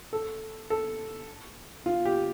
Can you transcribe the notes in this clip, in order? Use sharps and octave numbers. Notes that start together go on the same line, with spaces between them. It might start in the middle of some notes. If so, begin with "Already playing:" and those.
A4
A4
F4
G4